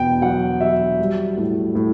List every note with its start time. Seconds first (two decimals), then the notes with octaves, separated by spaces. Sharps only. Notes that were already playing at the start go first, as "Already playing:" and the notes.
Already playing: E2 B2 G5
0.22 F#3 F#5
0.61 F#3 E5
0.99 G3
1.37 A2
1.75 A2